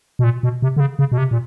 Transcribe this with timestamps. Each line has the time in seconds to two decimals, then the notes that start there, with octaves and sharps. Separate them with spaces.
0.19 B2
0.24 A#2
0.43 B2
0.62 C3
0.77 D3
0.80 C#3
0.99 C#3
1.12 B2
1.18 C3
1.31 A#2